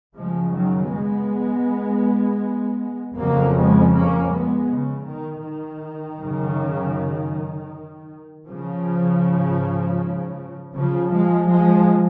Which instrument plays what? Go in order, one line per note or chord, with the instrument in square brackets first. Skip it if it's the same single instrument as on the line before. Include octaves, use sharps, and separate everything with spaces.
[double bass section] F#2 C#3 F3 G#3
D#3 F#3
G#3 B3
F2 C#3 F#3 A#3
G#3 B3
A#3 C#4
G#3 B3
C#3
D#3
D#3
F#2 C#3
C#3 F3
G#2
C#3 F3
F3 G#3
F3 G#3